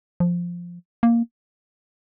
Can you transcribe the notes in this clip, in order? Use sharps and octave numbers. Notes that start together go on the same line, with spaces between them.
F3
A#3